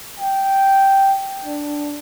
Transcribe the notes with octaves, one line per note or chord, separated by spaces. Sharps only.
G5
D4